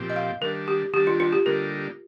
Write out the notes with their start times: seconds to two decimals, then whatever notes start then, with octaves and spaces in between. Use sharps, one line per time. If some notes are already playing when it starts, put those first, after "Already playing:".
Already playing: A#2 F3 C4 G4
0.10 D#5
0.16 F5
0.41 D#3 G3 D4 A#4
0.68 G4
0.93 D#3 G3 D4 G4
1.07 F4
1.20 F4
1.33 G4
1.46 D3 G3 A#3 D#4 A#4